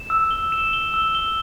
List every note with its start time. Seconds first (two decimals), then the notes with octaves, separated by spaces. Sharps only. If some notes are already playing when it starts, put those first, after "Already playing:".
Already playing: E7
0.10 E6
0.31 G7
0.52 E7
0.73 G7
0.94 E6
1.15 G7